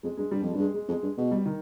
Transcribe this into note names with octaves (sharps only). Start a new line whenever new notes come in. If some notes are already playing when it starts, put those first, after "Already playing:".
F2 G#3
G2 G#3
G2 G3
F2 F3
G3
G2 G#3
G#3
F2 G#3
G2
B2 G#3
G3
D#3